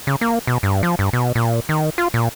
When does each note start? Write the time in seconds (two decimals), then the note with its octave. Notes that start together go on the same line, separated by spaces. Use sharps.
0.07 C#3
0.21 A#3
0.47 B2
0.63 G2
0.83 F3
0.99 G2
1.13 B2
1.35 A#2
1.69 D#3
1.98 F4
2.14 A#2